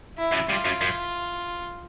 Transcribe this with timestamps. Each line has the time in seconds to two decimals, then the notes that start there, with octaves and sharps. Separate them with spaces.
0.18 E4
0.33 F#2
0.49 G2 F4
0.65 F#2
0.81 F#2